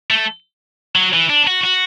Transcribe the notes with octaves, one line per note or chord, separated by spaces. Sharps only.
A3
F#3
E3
D4
F#4
F#4